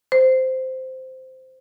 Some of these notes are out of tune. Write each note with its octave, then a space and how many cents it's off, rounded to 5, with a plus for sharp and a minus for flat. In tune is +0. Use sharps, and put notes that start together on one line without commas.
C5 -10